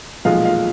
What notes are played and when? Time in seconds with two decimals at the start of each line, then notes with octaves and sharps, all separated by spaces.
0.25 B1 A#2 F3 G#3 F5
0.45 F5